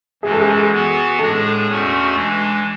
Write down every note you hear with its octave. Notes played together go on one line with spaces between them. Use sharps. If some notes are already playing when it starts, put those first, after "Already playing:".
F#2 E3 G#3 G#4
A4
G#4
E3 B3 F#4
A2 G#3 D4 G#4 A4
E2 B2 A3 C#4 F#4
E3 G#3 D4